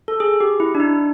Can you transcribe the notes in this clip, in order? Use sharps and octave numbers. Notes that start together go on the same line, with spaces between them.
A4
G#4
G4
E4
D4
D#4